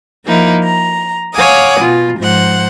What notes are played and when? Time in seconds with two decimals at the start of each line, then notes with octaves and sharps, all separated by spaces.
0.25 F3 A#3 D#4 E4
0.64 A#5
1.35 C#5 F5 F#5 G#5 D6 D#6
1.79 B2 F4
2.19 G#2 F3 C5 F#5